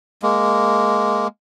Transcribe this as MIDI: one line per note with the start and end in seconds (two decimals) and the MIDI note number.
0.23 1.27 56
0.23 1.27 58